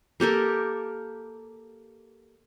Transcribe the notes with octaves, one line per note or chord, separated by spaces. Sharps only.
A#3 G4 A4 A#4